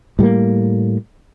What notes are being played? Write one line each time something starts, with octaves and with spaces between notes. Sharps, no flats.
A2 G3 G#3 A#3